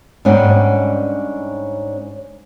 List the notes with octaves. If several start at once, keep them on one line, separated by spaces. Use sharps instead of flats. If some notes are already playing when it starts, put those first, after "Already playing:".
G#2 G3 C#4 D4 F#5 G5